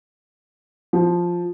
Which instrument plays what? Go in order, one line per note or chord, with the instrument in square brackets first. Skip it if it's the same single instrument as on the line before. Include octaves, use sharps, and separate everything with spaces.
[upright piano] F3